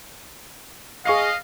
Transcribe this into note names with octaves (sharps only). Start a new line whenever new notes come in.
G#4 D#5 F5 C#6 C7